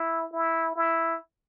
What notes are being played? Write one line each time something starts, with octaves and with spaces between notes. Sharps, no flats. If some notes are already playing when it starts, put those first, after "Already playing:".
Already playing: E4
E4
E4